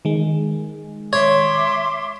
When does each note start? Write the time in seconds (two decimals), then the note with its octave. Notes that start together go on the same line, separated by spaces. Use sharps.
0.05 D#3 G#3
1.13 C#5 E5 C6 D6